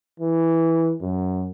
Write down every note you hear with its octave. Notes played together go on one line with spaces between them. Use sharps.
E3
F#2